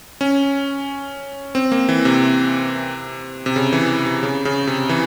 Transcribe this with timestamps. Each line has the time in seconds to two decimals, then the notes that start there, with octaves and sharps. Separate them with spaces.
0.21 C#4
1.55 C4
1.72 A#3
1.89 E3
2.05 C3
3.46 C3
3.56 C#3
3.73 E3
4.06 C3
4.23 C#3
4.45 C#3
4.67 C3
4.89 E3